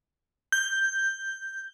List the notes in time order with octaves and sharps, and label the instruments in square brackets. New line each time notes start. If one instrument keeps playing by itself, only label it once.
[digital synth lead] G6